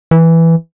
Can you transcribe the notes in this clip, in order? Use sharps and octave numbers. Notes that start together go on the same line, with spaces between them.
E3